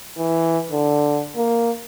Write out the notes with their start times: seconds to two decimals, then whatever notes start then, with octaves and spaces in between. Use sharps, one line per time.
0.18 E3
0.71 D3
1.36 A#3